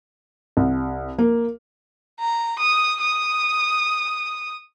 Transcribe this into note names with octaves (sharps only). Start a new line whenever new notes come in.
C2
A#3
A#5
D#6
D#6